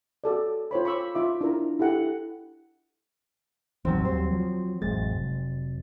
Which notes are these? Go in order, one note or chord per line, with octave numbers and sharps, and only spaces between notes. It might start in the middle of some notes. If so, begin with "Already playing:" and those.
F#4 A4 D5
F4 C5 C#5 B5
B5 C#6 D6 E6
F4 E5 D6
D4 E4 A#4 A#5
E4 G4 A4 F#5
A1 F2 D#3 F#3 C4
D#2 G3 C5
F3 F#3
A1 F2 G#3 A6
F1